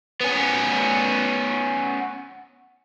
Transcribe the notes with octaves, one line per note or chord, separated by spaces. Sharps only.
B3 C#4